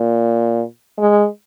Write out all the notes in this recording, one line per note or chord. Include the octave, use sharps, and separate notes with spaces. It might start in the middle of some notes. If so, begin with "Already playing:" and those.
Already playing: A#2
G#3